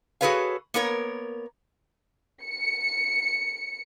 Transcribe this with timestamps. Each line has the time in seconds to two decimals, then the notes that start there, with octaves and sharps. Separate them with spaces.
0.21 F#4 G#4 A4 B4 C#5 F5
0.74 A#3 B3 A#4 C#5
2.45 C#7